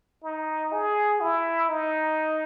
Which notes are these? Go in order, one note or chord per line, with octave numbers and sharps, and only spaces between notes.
D#4
G#4
E4
D#4